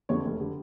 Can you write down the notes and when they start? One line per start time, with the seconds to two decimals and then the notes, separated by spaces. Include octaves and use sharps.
0.09 F2 D3 G3 C#5
0.25 F1
0.40 D3 G3